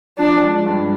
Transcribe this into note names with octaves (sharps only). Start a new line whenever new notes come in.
F3 D4
G#3
G2